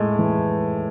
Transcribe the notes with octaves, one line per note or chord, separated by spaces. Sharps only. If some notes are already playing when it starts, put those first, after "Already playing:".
Already playing: A2 G#3
E3